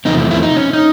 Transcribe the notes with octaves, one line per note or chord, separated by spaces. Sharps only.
E2 C3 F3 A3 C4 D#4
E4
E4
D#4
C#4
D#4